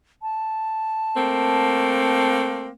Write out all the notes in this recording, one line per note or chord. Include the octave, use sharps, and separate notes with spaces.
A5
A3 A#3 C4